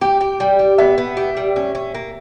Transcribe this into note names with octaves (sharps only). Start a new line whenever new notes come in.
G4 G5
G4
G3 G5
G4
B3 E5
B3
G4
G3
C#4
C#4
A#3